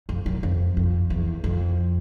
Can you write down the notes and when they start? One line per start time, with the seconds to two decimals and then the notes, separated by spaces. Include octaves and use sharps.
0.09 F2
0.26 F#2
0.43 F2
0.77 F2
1.10 E2
1.44 F2